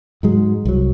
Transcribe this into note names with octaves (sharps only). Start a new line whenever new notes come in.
G#2 F#3 G#3
C2 F#3